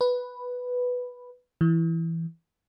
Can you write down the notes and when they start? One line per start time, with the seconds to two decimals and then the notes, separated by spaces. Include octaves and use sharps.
0.01 B4
1.61 E3